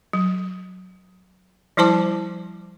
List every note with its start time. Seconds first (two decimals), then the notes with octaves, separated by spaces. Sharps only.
0.13 F#3
1.77 F3 G3 E4 C5 A5 D6